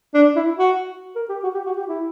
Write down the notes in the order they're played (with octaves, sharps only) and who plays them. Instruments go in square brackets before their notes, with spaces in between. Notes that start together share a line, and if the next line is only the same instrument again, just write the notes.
[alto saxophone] D4
E4
F#4
A#4
G4
F#4
G4
F#4
G4
E4